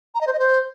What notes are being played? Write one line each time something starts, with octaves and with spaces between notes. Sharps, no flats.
A#5
D#5
C5
D#5
C5